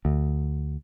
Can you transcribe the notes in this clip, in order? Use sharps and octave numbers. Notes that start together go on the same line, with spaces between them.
D2